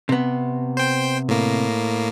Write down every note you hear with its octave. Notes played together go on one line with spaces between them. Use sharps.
C3 B3
C5 G5
A2 A#3